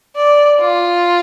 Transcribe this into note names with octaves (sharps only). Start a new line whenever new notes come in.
D5
F4